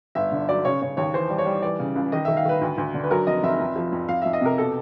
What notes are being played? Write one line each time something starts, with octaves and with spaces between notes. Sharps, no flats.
G1 E5
D3
F#3 D5
C#3 C#5
C#3 C#5
D#2 C#5
E3 C5
G3
C#5
G3
E3 D5
C#3
C#2
D#3 D#5
D#3 E5
F5
D#3 B4
D2
D2
D3
B4
F#3 A#4
F1 D#5
F1 E5
F2
F3
F2
F2 F5
F2 E5
D#5
C3 A#4
B2 A4